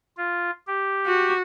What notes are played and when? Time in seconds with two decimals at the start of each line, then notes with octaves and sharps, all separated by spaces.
0.17 F4
0.67 G4
1.06 F#4